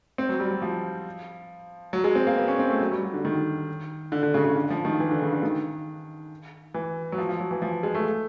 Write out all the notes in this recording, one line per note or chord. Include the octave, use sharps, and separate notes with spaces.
C4
F#3
G3
F#3
F3
F#3
G#3
C4
A#3
B3
C#4
C4
A3
F#3
G3
F#3
D3
D#3
D3
D3
C#3
C#3
D3
F3
D#3
E3
D3
C#3
D3
D#3
E3
F#3
F3
F3
F#3
E3
F3
G#3
A3